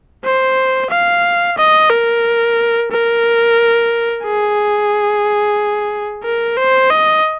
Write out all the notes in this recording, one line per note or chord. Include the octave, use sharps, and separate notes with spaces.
C5
F5
D#5
A#4
A#4
G#4
A#4
C5
D#5